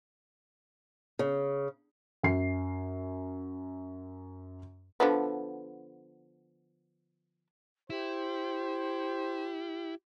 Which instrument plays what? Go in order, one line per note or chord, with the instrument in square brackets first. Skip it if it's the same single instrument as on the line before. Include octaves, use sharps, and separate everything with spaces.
[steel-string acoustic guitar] C#3
[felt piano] F#2 C7
[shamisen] D3 F3 B3
[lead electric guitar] E4 [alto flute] G4 [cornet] C5